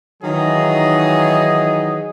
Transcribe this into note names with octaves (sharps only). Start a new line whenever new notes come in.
D#3 E3 F#3 D#4 G#4 D#5